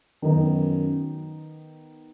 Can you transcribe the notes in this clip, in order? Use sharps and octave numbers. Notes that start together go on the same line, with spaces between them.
F#2 D#3 B3 D#4